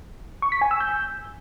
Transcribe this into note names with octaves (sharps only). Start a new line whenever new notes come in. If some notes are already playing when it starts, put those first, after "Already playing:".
C#6
B6
G#5
E6
G6